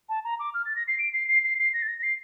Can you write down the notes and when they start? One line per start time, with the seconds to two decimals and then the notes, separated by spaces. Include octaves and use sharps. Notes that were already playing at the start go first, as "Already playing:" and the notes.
0.09 A5
0.24 A#5
0.39 D6
0.54 F6
0.65 A6
0.75 A#6
0.87 C7
0.98 D7
1.13 C7
1.28 C7
1.43 C7
1.58 C7
1.73 A#6
1.82 A6
1.88 A#6
1.98 A#6
2.03 C7